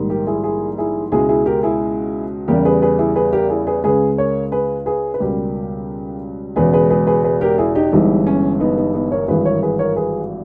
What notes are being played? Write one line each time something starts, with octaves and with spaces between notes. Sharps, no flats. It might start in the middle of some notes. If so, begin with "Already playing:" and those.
Already playing: A#1 G#2 D#3 G3
G4 A#4
E4 G#4
E4 G#4
E4 G#4
C#2 B2 G#3 E4 G#4
E4 G#4
G4 A#4
E4 G#4
E2 C#3 G3 G4 A#4
G#4 B4
G#4 B4
E4 G#4
G#4 B4
G4 A#4
E4 G#4
G#4 B4
C#2 C#3 G#3 G#4 B4
A#4 C#5
G#4 B4
G#4 B4
B4
C#2 B2 G3 G4 A#4
E1 E2 C#3 G#3 G#4 B4
G#4 B4
G#4 B4
G#4 B4
G#4 B4
G4 A#4
E4 G#4
D#4 G4
G1 G2 E3 G#3 D#4 G4
C#4
B3 D#4
B3 D#4
B3 D#4
A#4 C#5
G#1 G2 E3 G#4 B4
A#4 C#5
G#4 B4
A#4 C#5
G#4 B4